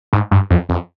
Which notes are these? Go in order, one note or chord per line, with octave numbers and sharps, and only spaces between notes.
G#2
G2
F2
F2